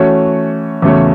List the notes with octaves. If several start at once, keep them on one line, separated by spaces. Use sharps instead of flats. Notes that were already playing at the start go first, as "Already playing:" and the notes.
Already playing: E3 A3 C#4 F#4 C#5
E2 C#3 A3 F#4 C#5